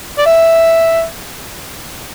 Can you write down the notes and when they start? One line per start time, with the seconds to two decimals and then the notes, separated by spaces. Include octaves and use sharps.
0.18 D5
0.26 E5